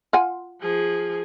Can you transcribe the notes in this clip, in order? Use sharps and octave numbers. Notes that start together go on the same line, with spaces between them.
F4 F#5 G#5
F3 G#4